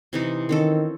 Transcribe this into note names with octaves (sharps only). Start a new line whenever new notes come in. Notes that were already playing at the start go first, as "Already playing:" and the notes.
C3 E3 D#4
D#3 C4 C#4 A4